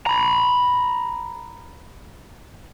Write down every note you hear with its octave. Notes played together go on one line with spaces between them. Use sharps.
A#5 B5